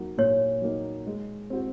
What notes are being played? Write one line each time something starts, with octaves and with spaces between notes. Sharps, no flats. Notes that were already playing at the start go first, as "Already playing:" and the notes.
Already playing: F#3 A#3 D#4
A#2 C#5
F#3 A#3 D#4
G#3
C4 F#4 C5